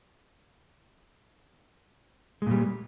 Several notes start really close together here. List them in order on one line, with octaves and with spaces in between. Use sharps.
G#3 A#2 G3